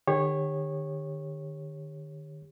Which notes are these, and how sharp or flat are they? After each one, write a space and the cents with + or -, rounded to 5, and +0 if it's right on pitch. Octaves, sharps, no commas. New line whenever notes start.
D#3 -45 G4 +30 C#5 -15